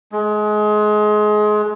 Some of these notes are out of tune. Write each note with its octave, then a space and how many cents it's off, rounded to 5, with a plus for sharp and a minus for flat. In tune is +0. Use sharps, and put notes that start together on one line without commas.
G#3 +25